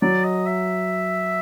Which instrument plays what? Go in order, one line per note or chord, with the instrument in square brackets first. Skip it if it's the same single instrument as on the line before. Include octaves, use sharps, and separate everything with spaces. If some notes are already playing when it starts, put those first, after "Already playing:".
[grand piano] F#3 [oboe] D5
[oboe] D#5
E5